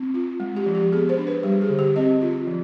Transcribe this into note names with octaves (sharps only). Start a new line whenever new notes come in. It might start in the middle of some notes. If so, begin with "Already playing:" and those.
Already playing: C4
F4
G#3
G4
F3
G4
B3 G#4
C5
D4
B4
G3 G4
G#4
D3
G4
C4 D#5
F4
F3